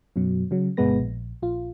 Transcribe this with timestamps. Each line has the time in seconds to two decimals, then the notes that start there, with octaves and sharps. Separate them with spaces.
0.16 F#2 B2 F#3
0.51 C#3 F#3
0.77 G1 B2 G#3 B3 B4 A#6
1.00 A#1
1.42 A#1 F4